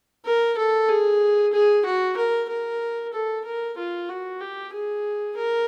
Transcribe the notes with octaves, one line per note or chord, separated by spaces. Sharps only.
A#4
A4
G#4
G#4
F#4
A#4
A#4
A4
A#4
F4
F#4
G4
G#4
A#4